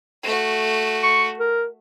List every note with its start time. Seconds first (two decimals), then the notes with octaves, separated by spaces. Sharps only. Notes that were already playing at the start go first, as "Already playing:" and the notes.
0.23 A3 F#4
1.03 C#6
1.39 A#4